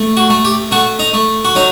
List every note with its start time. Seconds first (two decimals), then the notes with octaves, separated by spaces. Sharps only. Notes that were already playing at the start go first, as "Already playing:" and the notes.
Already playing: A3
0.17 F#4
0.30 A3
0.44 G4
0.71 A3 F#4
0.99 D#4
1.13 A3
1.45 F#4
1.55 F#3 D#4